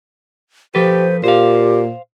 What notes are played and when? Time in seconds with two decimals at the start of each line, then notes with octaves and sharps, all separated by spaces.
0.75 F3 G4 A4 B4 C5
1.24 A#2 G4 C5 F5